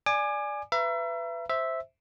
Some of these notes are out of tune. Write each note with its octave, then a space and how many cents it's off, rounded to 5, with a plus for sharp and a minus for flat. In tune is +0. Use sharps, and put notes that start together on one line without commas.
D5 +0 G#5 +0 D6 +30
B4 +15 E5 +35 A#5 +25
C5 +0 E5 -5